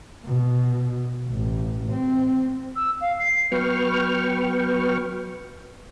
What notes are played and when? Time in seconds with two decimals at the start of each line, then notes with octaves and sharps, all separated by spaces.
0.25 B2
1.29 A1
1.92 C4
2.76 E6
3.01 F5
3.19 C7
3.52 F#3 B3 B4 G5 C#6 F6